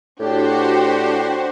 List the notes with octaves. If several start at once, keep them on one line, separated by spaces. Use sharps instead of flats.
A2 D4 F#4 G4 C5